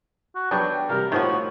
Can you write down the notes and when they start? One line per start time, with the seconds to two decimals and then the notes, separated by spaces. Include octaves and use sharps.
0.35 F#4
0.51 F#3 B3 D4 F#4 G5 C#6
0.89 C3 G3 A#4
1.12 A2 D#3 F3 F4 F#4 C#5